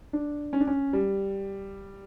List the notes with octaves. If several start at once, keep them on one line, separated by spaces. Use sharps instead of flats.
D4
C#4
D4
C#4
G3